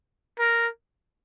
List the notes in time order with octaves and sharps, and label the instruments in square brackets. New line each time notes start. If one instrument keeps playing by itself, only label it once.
[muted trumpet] A#4